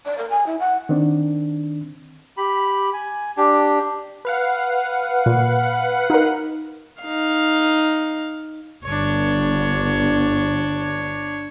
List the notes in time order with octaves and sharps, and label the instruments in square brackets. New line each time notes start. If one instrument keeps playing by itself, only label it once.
[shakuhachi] D5
A#4
G#5
E4
F#5
[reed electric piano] D#3 C4 D4
[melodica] G4 B5
G#5
D4 G4
[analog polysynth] B4 F5 F#5
[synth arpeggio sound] A#2
D#4 A#4
[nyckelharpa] D#4 F5
[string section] G1 [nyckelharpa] D4 C#5